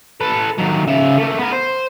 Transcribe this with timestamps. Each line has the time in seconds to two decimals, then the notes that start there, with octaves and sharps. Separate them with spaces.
0.20 A4 B4
0.59 D#2 F#3
0.87 C#3 E5
1.18 A3 A#3
1.38 B3 A#4
1.52 C5